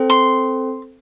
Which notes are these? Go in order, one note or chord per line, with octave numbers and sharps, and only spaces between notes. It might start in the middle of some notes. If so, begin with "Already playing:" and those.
Already playing: C4 A4 C5 G5
C6